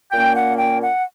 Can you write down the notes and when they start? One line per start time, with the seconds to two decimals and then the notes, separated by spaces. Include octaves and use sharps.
0.12 A#2 A#3 C#4 G5
0.35 F#5
0.59 G5
0.82 F#5